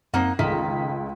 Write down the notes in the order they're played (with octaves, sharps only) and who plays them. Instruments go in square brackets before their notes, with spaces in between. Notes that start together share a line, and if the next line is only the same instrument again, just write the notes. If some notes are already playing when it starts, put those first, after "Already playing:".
[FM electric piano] F#2 C4 [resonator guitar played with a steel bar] A#3 D#4 F#5
[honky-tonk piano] C#2 A3 G#4 [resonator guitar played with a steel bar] D#3 [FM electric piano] B6